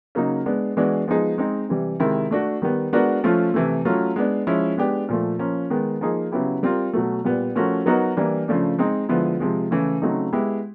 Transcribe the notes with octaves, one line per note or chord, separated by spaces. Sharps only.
C#3 F#3 A#3 D#4
G#3 B3 D4
E3 G#3 B3 D4 F#4
F3 G#3 B3 D#4 G#4
G#3 C4 D#4
C3 E3 G3
C3 D#3 G#3 C4 E4
A3 D4 F#4
D#3 G3 B3
G#3 B3 D4 F#4 A#4
F3 A3 C#4 F4
C3 E3 A3
F#3 A3 C#4 F4
G#3 B3 D4
F3 G#3 C#4 E4
G#3 B3 D4 G4
A#2 F3 A3
F3 A#3 C#4
D#3 G#3 B3
F3 A#3 D#4 G#4
C#3 F#3 B3 E4 G4
G3 C4 F4 A#4
B2 F#3 A3
A#2 G3 B3
F3 A3 C#4 F#4 A#4
F#3 B3 D#4 F#4 A#4
E3 G3 A#3 D4
C#3 F3 A3 D4
G#3 C4 D#4
D3 F3 G#3 B3 E4
C3 F3 G#3
C#3 E3 A3
C#3 F#3 A3 C4 D#4
G#3 B3 E4 G4